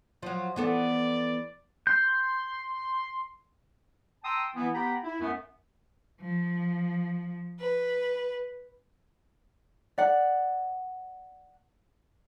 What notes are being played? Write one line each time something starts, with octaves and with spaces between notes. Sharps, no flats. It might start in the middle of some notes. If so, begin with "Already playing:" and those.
F3 F#3
E3 B3 A4 D5
C6 G6
G5 A5 A#5 C6 D#6 E6
E3 B3 E4
B3 G4 G5 A#5 B5
E4
F#2 A3 B3
F3
B4
D5 F#5